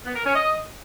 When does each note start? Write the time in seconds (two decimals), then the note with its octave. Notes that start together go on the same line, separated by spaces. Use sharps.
0.05 B3
0.15 A#4
0.25 C#4
0.34 D#5